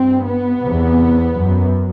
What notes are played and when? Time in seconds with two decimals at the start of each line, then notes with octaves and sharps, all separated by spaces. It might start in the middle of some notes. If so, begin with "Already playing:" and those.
Already playing: G2 C4
0.26 B3
0.60 E2 C3
1.32 F#2